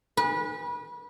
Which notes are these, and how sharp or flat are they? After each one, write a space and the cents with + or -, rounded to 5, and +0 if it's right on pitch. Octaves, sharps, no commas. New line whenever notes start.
B4 -30